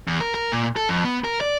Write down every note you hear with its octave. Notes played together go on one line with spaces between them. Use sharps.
E2
A#4
A#4
A#2
A4
F2
B3
A#4
D5